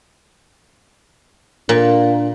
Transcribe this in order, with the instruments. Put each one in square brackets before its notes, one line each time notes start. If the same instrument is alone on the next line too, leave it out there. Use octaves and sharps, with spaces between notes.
[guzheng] A#2 [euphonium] D4